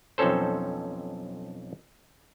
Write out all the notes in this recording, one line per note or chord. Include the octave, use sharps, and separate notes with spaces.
B1 F2 C4 C#4 A4 C5